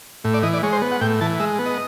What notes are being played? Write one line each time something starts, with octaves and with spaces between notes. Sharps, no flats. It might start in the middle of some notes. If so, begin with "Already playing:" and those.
A2
D5
E3 D#5
D5
G#3 C#5
C5
B3
F#5
A2 G5
E3 A5
G#3 E5
B3
D#5